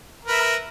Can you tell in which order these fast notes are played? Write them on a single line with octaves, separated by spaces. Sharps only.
A#4 B4 E5